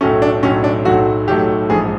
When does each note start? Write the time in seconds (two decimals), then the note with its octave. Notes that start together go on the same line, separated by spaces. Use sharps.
0.01 B1 A2 F#3 A3 C#4
0.22 D4
0.43 B1 A2 F#3 A3 C#4
0.64 D4
0.85 B1 A2 F#3 A3 F#4
1.28 B1 A2 F#3 A3 G4
1.70 A#1 G#2 F3 G#4